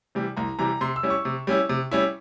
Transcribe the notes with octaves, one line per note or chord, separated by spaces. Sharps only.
C3 E3 G3
C2 A#5
C3 E3 G3 A#5
C3 C6
E6
G3 C#4 E4
C#6
C3
G3 C#4 E4
C3
G3 C#4 E4